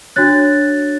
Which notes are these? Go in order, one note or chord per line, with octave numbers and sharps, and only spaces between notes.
D4 F#4 C#5 F#6 A6